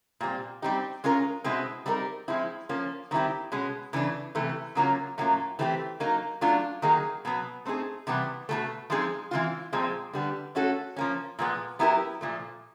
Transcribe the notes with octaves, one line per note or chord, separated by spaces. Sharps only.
A#2 G3 C4
G3 C4 D#4 G4
G#3 C#4 F4 A#4
B2 G#3 C4 E4
G3 C4 D#4 F#4 A#4
F3 G#3 C4 E4
F3 A#3 C#4
D#3 G3 C4 E4 G4
B2 G#3 C#4
C#3 E3 A3 D4
C3 E3 A3
C#3 F#3 A#3 C#4 F4
A2 F#3 A#3 C#4 F4
E3 A3 C4 D#4 G4
F#3 A#3 D#4
F#3 A3 D4 F4
D#3 F#3 A#3 D#4 G#4
B2 F#3 B3
A3 C4 D#4 G#4
C3 E3 G3 B3
B2 F#3 A3
F3 G#3 C4 D#4 G#4
E3 G#3 C4 F4
A#2 F3 G#3 C4
D3 G3 B3
A3 C#4 F#4 A4
F3 A#3 C#4
A#2 F3 G#3 B3
F#3 B3 E4 G4 A#4
A#2 F3 A3